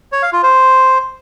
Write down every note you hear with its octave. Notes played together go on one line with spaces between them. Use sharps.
C#5
F5
F4
C5